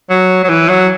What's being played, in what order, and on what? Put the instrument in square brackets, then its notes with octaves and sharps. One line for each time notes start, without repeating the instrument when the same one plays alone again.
[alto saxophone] F#3
F#3
E3
F#3